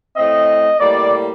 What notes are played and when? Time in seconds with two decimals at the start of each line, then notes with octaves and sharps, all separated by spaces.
0.17 A2 A3 C4 D#5
0.80 A2 G3 A#3 D5